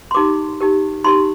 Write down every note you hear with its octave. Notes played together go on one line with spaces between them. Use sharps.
C6
D#4 G4 A#4 D6
D#4 G4 A#4
D#4 G4 A#4 C6